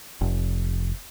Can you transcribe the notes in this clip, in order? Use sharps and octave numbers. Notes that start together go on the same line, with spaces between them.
F1